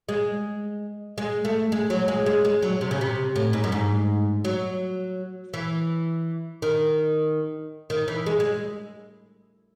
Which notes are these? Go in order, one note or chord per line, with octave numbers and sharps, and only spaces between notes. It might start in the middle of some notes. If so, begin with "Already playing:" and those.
G#3
G#3
A3
G#3
F#3
G#3
G#3
G#3
F#3
C3
C#3
C3
A2
G#2
F#2
G#2
F#3
E3
D#3
D#3
E3
G#3
G#3